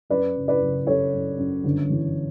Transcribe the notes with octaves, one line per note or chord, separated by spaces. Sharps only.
F#2 B4 D5
F#1
B4 D5
F#1
F#1 A4 C#5
F#2
F#2
G1
E3